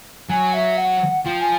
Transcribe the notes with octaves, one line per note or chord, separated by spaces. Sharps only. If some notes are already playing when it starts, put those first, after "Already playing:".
F#3 G#5
E5
F#5
F3 G5
G#5